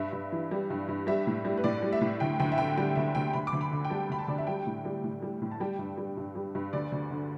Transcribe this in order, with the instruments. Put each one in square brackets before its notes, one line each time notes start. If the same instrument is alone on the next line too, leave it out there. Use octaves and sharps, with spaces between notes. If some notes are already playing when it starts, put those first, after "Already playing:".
Already playing: [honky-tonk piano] G2 E5
G2
E3
G3
G2
G2
G3 E5
A2
G3
B4
A2 D5
G3
E5
A2
D2 G5
D2 G5
E5
D3 G5
G3 G5
D2 E5
D2 G5
D2 B5
D6
D2
B5
D3
G5
G3 A5
D2 B5
A5
D2 D5
E5
G3 G5
A2
G3
A2
G3
A2
A5
G3 G5
G2
G3
G2
G3
G2
D2 D5
D2
D3